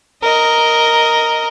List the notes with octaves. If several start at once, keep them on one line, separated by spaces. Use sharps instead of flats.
A#4 D#5